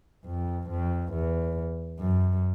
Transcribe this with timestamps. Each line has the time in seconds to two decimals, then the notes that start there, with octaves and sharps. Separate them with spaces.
0.26 F2
0.70 F2
1.13 E2
2.00 F#2